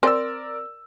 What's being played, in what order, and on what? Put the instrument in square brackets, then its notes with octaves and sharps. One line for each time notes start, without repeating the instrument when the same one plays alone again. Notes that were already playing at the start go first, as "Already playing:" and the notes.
[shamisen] C4 C5 [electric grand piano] A#4 D5 E6